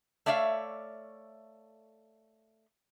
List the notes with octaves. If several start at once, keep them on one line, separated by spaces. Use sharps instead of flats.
A3 C#5 D5 E5 F5